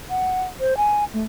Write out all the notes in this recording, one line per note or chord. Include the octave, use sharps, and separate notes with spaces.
F#5
C5
G#5
A3